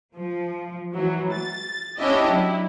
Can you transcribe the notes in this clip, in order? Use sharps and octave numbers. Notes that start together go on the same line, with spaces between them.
F3
E3 F#3
A6
C#4 D4 E4 G4 D#5
F#3 E4